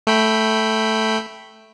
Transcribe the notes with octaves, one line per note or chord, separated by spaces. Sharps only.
A3 G5 B5